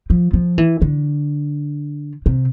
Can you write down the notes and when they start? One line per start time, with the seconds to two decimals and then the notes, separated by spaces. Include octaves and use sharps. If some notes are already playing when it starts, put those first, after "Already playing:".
0.10 F3
0.33 F3
0.58 E3
0.82 D3
2.26 C3